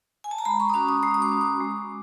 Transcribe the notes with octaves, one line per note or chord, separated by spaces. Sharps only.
G#5
A5
A#5
G#3 B5
C#6
D#6
C#4 F#4 D6
D#6
G#3 D#6
D#6
D6
C#4 F#4
D6
G#3